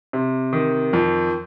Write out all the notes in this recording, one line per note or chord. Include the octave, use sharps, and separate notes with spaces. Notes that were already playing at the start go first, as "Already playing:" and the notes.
C3
D#3
F2